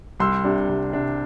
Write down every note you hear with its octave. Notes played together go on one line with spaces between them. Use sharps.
C2 C6 E6
C3 G3 D4
C2
C3 G3 D4